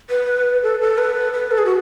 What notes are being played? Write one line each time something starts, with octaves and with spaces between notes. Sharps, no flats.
B4
A4
A4
B4
B4
A4
G#4
F#4